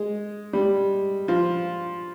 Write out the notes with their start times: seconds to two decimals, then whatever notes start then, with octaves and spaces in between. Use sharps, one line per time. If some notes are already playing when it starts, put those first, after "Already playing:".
Already playing: G#3
0.53 G3
1.28 F3